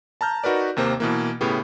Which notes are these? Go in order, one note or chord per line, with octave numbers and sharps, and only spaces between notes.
A5 A#5 F6 G6
D#4 F#4 A#4 B4 D5
D#2 C3 A#3 C5
B2 E3 A#3
A2 C#3 B3 G4